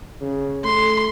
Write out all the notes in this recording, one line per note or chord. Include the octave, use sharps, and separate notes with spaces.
C#3
A3 C6